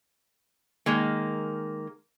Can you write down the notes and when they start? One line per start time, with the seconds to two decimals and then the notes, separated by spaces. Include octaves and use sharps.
0.86 D#3 G#3 A#3